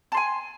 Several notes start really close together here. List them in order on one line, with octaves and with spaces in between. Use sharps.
A5 C6 G#5